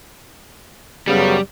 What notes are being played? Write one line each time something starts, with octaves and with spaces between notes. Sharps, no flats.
F#2 C#3 G3 B3